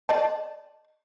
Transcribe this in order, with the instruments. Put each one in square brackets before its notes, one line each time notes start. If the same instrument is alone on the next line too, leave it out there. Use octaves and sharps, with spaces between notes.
[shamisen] D5 D#5 A5